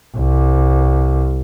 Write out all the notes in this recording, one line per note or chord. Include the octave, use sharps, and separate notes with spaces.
C2